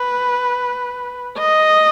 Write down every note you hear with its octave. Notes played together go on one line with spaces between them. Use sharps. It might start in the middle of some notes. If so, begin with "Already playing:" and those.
Already playing: B4
D#5